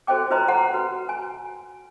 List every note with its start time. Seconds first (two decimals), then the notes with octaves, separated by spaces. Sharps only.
0.07 F#4 A4 C5 D#5 G5 D6
0.31 F4 B4 C5 D#5 A#5 C6
0.48 F#5 A#5 C6
0.73 F#4 B4
1.09 G#5